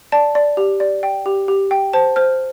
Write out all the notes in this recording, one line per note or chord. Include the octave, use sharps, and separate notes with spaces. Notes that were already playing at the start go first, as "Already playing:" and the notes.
D5 A5
D5
G4
D5
G5
G4
G4
G5
C5 A5
C5 F6